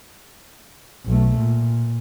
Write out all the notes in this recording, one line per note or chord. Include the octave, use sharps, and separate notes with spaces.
B1 A3
A#2